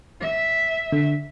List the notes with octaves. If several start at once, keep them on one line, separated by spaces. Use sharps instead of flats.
E5
D3